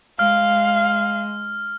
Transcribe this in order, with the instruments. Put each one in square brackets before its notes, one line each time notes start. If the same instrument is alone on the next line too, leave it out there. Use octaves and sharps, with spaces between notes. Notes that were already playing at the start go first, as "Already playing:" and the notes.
[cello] G#3 [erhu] F5 [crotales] F6